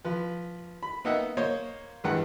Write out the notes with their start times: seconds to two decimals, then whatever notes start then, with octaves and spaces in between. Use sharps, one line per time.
0.05 F3 B4
0.83 B5
1.05 A#3 B3 D#4 D#5 E5 F#5
1.37 A#3 C5 C#5 D#5
2.04 A1 G2 E3 G#3 F#5